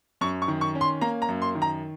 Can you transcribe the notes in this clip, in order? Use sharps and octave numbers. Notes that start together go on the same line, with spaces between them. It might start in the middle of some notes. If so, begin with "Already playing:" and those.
F#2 C#6
C#6
D#3
C#6
C#4
C6
A#3 A#5
A#5
F#2
C6
D#3
A#5